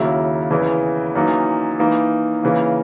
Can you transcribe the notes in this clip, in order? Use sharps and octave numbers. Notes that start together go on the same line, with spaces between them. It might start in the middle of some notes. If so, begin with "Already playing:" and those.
Already playing: D#2 C#3 F#3 A#3 E4
E2 C#3 E3
F#2 E3 A#3 D#4
E3 A#3 D#4
C#3 E3 A#3